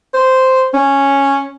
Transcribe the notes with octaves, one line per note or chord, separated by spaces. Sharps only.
C5
C#4